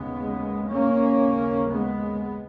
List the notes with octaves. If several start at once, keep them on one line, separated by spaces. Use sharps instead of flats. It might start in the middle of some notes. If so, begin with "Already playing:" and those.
Already playing: D#2 C#3 G#3 B3
A#3 C#4
D#2 C#3
G#3 B3